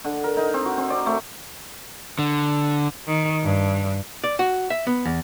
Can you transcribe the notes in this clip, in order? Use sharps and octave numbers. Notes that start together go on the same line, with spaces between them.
D3
A#4
D#4
C4
F#4
C4
D5
A3
D3
D#3
G2
D5
F#4
E5
B3
E2